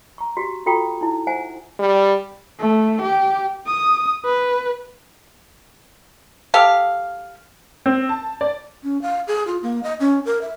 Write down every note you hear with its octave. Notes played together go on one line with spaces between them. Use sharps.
A#5 C#6
F#4 G4
F4 F#4 A4 G5 A#5 C#6
D#4 E4
C5 E5 F#5 G#5
G3
A3
G4
D#6
B4
G4 A4 F5
C4
A5
D5
C#4
F5
G#4
F4
A#3
D#5
C#4
A#4
E5